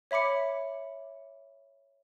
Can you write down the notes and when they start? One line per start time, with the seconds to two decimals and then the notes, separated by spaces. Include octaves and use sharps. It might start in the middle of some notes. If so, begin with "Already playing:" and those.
0.11 C#5 E5 B5 D6 C#7